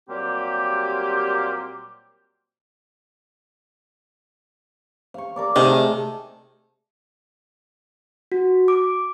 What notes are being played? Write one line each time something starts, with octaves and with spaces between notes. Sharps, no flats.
A#2 F#3 G3 A#3 C4 G4
F5 C#6
A#4 D5 D6
C3 D#3 A3 D#4 G#4
F#4
D6